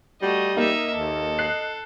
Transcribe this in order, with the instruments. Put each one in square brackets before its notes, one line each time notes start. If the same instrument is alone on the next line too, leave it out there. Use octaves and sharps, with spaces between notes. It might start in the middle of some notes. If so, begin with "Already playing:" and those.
[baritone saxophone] G3 [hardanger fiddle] A3 D#5 [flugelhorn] F#4
[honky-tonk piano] A#3 [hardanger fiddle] D#4 E5 [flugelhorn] D#5
[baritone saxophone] D#2 [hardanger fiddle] A4
[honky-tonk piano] F#6 C7